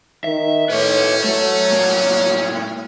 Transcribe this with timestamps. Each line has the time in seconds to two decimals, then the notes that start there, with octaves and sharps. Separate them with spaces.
0.24 D#3 E5
0.70 A2 C#4 B4 C#5
1.24 F#3 A3
1.72 A2 A#3